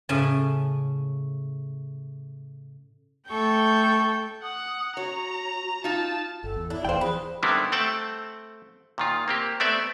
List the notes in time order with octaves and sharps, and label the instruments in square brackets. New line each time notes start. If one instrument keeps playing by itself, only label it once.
[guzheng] A2 C#3 G#5 A5
[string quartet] A3 A4 G5 C#6 G6
[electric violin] F#5 [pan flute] D#6
[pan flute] F#4 [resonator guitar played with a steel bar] C#5 [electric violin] A#5
[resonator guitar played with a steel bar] D#4 F4 [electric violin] A5
[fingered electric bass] G1 [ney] A4
[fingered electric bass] E2
[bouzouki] D4 [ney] E4
[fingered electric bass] D1 E2 B3 [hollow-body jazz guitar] C5 G5 [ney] F5
[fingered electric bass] E3 F3 [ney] G#4 [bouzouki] B4
[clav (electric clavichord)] D3 D#3 G3 B3 C4 E4
A3 C4 F#5 G5 A5
A#2 D#3 F4
A#3 C4 G4
A3 B3 C4 D5 E5